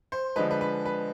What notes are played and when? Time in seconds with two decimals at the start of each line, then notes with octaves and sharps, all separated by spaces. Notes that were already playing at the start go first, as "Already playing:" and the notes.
0.12 C5
0.36 D3 F3 G#3 B4
0.51 B4
0.61 B4
0.85 B4